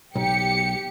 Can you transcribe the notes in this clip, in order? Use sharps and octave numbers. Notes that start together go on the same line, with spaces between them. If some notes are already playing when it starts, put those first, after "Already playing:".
B1 G4 C#7